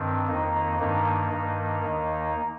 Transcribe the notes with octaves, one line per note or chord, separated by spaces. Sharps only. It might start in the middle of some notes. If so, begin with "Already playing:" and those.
Already playing: G2 D#3 C4
F2 D#3 A#3 D#4
G2 D#3 A#3 D#4
G2 D#3
D#2 D#3